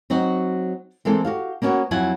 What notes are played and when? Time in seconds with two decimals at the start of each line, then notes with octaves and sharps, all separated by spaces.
0.10 F#3 C4 D#4 F#4
1.05 E3 G#3 A#3 C4 A4
1.25 F#4 G4 F5
1.62 A#3 B3 C#4 F4 F#4
1.91 F2 F#3 E4 F4 F#5 G#5